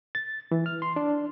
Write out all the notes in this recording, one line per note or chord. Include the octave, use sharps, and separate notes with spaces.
A6
E3
F6
C6
D4